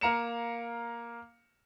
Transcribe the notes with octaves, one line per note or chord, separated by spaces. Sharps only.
A#3 F5 A#5 C#7 E7